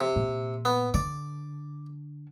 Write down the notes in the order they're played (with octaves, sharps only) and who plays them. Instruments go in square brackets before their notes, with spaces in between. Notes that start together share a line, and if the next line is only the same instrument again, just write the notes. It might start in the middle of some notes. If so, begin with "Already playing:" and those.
[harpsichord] C3
[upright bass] A#2
[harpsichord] B3
[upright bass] D3 [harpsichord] D5